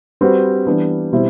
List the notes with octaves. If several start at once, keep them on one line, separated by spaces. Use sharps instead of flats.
G3 C4 F#4 B4
E3 G3 B3 D4
B2 G3 C4 E4